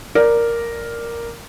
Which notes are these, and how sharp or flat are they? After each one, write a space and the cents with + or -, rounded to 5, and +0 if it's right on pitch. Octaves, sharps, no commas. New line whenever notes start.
A#4 +0 D5 +0